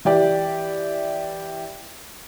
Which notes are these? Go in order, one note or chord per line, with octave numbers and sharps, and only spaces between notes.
E3 G4 D5